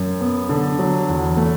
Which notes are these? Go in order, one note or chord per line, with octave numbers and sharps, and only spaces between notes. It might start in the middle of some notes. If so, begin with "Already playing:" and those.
Already playing: F#2
B3
D3
F#3
E2
A3